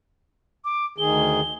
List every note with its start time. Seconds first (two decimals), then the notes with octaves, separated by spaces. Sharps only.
0.65 D6
0.98 D2 D#3 G#4 G7